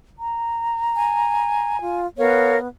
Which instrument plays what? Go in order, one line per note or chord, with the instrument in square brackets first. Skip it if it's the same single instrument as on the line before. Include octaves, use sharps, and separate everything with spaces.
[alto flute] A#5
[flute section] G#5
[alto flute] F4
[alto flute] B3 [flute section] A#4 C#5 F5